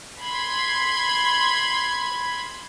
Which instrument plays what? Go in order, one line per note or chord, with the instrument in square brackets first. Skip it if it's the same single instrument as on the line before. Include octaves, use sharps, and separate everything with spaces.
[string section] B5 C6 G#6